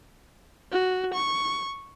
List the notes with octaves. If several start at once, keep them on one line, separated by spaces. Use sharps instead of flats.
F#4
C#6